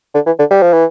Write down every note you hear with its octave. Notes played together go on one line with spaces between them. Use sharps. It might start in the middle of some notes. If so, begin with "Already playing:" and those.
D3
E3
D3
G3
F3
E3